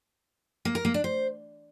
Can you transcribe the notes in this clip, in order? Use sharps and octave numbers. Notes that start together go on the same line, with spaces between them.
A#3
A#4
A#3
D4
C5